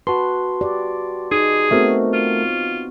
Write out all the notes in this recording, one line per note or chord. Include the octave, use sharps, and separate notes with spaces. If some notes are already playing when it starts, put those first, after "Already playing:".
F#4 B4 A5 C6
G4 D5
D#4 G#4
A3 B3 C4 F#4 A#4 C5
F4